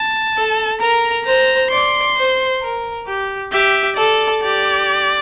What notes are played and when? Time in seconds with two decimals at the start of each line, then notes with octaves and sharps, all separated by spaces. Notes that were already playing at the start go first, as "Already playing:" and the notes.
Already playing: A5
0.36 A4
0.81 A#4 A#5
1.26 C5 A#5
1.71 D5 C6
2.17 C5
2.62 A#4
3.07 G4
3.52 G4 E5
3.97 A4 D5
4.43 G4 D5